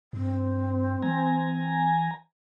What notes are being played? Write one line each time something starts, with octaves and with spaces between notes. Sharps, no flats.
G2 C4
E3 G#5 A#5